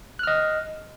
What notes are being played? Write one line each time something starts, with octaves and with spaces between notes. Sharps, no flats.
D#5 F6 F#6